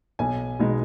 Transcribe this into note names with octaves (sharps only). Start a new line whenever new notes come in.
B1 G#5
B2 G#3 D#4